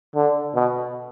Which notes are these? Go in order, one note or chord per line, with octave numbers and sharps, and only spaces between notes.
D3
B2